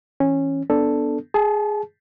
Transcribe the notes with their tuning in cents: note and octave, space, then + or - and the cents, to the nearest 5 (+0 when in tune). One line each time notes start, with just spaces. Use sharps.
E3 +0 C#4 -15
B3 +0 D4 +0 A4 +0
G#4 +0 A5 -30